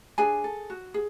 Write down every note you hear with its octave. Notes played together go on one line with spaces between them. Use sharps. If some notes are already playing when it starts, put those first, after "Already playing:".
D4 G#4 G#5
A4
F#4
G#4